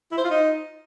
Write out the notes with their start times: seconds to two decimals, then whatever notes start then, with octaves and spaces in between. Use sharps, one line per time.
0.12 E4
0.18 C5
0.24 F4
0.30 D#4